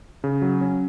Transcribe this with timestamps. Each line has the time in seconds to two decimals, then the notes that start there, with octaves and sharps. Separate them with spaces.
0.24 C#3
0.42 F#3
0.61 C#4